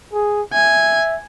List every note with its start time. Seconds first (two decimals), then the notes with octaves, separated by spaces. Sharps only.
0.13 G#4
0.53 E5 G#5